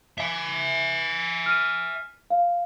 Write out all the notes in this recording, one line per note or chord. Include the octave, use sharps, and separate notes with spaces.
E5 G#5
F6 D#7
F5